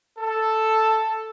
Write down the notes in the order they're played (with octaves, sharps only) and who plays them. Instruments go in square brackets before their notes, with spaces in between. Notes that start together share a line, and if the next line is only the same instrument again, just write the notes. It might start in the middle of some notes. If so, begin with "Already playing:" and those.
[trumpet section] A4